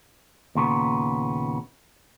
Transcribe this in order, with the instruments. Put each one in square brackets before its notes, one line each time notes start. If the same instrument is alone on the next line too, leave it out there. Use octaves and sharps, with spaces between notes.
[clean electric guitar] D#2 A#2 C#3 B3